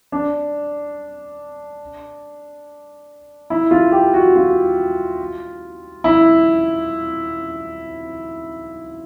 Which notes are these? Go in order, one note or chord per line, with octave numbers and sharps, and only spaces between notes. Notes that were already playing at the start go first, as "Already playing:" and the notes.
D4
E4
F4
G4
F#4
F4
E4